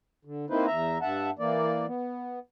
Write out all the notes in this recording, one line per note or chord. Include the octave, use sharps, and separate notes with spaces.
D3
A#3 C4 D#4 E4 B4 C5
E2 E5 A#5
G2 E5 F#5 A5
E3 A#3 D5
B3